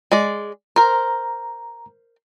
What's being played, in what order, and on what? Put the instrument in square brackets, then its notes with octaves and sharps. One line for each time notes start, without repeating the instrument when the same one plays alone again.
[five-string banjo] G#3 D5
[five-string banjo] A#4 C5 [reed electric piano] A#5